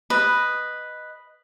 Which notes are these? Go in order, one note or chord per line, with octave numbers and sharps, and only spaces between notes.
B4 D#5